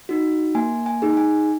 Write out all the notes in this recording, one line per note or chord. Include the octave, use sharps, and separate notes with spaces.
D#4 F#4
A#3 G#5
G#5
D#4 G#4
G#5